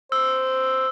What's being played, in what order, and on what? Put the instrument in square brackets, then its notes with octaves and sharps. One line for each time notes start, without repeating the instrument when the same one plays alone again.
[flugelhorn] C5 [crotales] E6